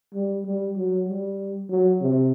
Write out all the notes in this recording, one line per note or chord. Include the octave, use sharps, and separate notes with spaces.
G3
G3
F#3
G3
F#3
C3